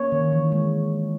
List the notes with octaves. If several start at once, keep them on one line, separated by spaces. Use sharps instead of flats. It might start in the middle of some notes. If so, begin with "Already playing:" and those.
Already playing: A#3 C#5
D#3
E3
G#3